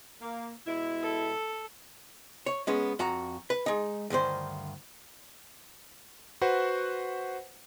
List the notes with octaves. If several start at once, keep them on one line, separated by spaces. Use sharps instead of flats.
A#3
B2 G#3 E4
A4
C#5
G#3 B3 C#4
F2 F#4 A#5
B4
G#3 D#4
D2 G2 D#3 C5
F#4 B4 C5 F#5